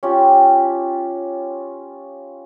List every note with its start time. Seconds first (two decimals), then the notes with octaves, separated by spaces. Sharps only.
0.03 C#4 F4 G4